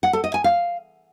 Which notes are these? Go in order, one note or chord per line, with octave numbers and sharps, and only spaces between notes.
F#5
A4
D#5
G#5
F5